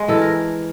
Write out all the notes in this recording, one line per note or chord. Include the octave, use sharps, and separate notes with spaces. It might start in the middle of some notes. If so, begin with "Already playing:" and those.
Already playing: G#3
E3 A4
A#4